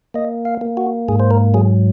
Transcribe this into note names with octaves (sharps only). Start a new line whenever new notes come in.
A#3 D#5
F5
A#3
F#4
G#2 G#4
C5
A#4
F#3 G#4